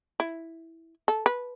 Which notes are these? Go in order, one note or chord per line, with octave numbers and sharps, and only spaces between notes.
E4
A4
B4